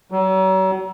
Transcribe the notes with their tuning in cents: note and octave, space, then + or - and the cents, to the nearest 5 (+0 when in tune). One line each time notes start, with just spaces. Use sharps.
F#3 +40